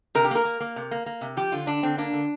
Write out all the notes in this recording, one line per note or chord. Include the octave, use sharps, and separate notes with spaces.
C3 A#4
G4
A#3 A#4
A#3
A#3
C3
A#3
A#3
C3
F3 G4
D3 F4
D3 D4
D3 C4
A#3 D4
D3